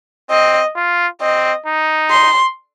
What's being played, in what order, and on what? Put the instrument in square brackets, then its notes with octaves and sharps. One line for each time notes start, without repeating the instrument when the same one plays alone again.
[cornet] C4 [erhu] D#5
[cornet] F4
[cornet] C4 [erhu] D#5
[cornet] D#4
[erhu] C6